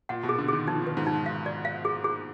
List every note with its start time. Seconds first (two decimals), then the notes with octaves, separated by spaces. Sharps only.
0.09 A#2 F#5
0.23 B2
0.29 G#4
0.39 D3
0.48 D#3 G#4
0.67 F3 D#4
0.82 D#3 B4
0.97 G#2
1.07 D#4
1.26 F5
1.46 D5
1.65 F5
1.85 G#4
2.04 G#4